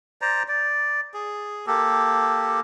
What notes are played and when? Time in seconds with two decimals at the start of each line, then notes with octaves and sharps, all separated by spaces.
0.22 C5 D5 A#5
0.48 D5
1.14 G#4
1.67 A#3 G4 A4